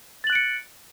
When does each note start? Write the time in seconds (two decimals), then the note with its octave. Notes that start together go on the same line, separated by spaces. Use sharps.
0.24 A6
0.27 F#7
0.30 F#6
0.32 D7
0.35 C#7